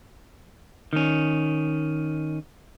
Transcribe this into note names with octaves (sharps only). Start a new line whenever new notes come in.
D#3 C#4